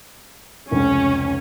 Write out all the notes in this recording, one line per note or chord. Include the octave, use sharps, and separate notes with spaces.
F1 C#2 C#4